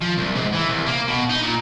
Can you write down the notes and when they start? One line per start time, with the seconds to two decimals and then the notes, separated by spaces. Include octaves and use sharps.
0.01 F3
0.18 C2
0.36 G#2
0.54 E3
0.69 C2
0.87 A#3
1.08 B2
1.30 D#4
1.42 A#2